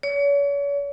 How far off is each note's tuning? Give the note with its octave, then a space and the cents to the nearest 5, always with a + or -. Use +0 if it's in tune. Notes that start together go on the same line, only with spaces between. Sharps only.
C#5 +40